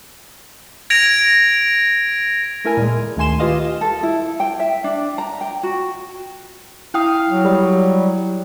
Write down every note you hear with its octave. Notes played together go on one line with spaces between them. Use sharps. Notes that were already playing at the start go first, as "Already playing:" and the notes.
G#6 A#6 D7 F7
A3 E4 A#4 G#5
A#2 G#3
D2 D#3 A3 G#5 C6 E7
F4 G4 B4 D#5 F5
A4
E4
G5
E5
D4
A#5
G5
F#4
E4 F5 G5 D#6
F#3
G3